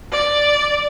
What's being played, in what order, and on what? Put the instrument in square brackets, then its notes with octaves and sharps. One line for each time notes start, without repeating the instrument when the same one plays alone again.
[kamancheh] D5